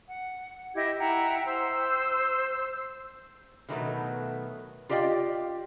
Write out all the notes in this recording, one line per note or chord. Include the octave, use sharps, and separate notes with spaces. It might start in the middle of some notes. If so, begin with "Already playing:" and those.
F#5
E4 G4 D#5 G#6
E4 F#5 G5 A#5
C5 E6
B2 D#3 F#3 G#3 A3 B3
F4 G4 D5 D#5 F5 G5